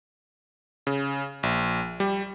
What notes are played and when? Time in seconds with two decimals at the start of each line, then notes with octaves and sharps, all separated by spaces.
0.87 C#3
1.43 A#1
2.00 G3